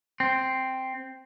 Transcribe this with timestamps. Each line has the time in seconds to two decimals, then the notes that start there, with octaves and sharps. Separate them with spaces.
0.20 C4